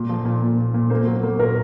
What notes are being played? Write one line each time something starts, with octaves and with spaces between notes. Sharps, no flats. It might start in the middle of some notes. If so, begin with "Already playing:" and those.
Already playing: A#2
F3
A#2
A#2
A#2
A#2
A#3 C5
F#3
A#3
A#2 A#4